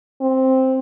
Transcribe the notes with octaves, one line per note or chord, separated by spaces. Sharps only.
C4